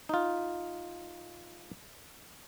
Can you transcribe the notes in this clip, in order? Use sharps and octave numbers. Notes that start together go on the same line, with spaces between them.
D#4 F4